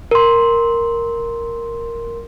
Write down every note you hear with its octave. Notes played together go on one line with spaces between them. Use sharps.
A#4 C6